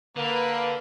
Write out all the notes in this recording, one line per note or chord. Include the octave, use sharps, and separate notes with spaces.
D3 A#3 B4 B5